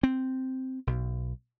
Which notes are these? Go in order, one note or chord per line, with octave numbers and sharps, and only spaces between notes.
C4
B1